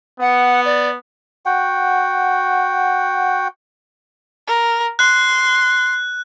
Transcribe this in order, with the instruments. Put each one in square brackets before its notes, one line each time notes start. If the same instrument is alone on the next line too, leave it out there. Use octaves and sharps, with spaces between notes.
[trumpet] B3 [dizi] F#5
[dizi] D5
[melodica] F#4 F#5 G5
[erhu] A#4
[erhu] C6 [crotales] F#6